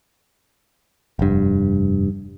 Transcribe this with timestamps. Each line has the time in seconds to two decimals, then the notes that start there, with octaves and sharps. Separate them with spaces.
1.19 F1 G2